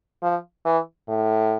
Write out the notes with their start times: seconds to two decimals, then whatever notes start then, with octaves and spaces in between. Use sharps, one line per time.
0.23 F3
0.65 E3
1.09 A2